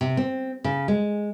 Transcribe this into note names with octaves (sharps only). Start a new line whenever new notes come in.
C3
C4
C#3
G#3